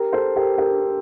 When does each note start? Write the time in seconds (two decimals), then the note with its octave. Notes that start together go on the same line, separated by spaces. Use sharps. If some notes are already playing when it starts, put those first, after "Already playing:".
Already playing: G4 A#4
0.12 A4 C5
0.36 G4 A#4
0.58 G4 A#4